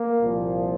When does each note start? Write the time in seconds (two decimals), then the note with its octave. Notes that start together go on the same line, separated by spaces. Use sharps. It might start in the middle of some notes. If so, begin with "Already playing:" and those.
Already playing: A#3
0.20 C2 A#2 F3